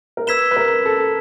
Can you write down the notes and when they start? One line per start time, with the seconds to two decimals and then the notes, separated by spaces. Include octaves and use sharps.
0.17 A#4
0.27 B4 E6 G#6 B6 E7 G7
0.51 B4
0.56 A#4
0.85 A4